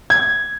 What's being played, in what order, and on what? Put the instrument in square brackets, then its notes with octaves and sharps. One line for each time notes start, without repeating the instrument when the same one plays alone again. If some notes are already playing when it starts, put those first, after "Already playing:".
[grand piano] G#6